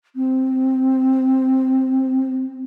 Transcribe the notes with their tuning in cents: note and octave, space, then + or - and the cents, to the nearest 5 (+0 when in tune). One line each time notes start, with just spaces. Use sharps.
C4 +0